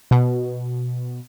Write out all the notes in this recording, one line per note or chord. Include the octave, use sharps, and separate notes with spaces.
B2